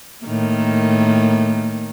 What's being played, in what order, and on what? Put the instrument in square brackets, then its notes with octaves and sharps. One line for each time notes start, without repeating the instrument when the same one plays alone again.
[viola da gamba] A2 D#3 A#3